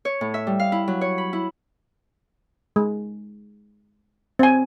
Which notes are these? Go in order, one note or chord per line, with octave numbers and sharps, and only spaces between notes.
C#5
A2
E5
G3
F5
E4
F#3
C#5
B5
E4
G#3
C4 G#5